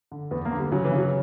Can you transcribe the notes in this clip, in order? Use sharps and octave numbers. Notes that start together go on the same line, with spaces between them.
D3
E2 B3
A#3
D3
G3
C#3 F#3
E3
C#3
F#3